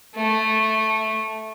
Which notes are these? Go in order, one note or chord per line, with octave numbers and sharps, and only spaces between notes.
A3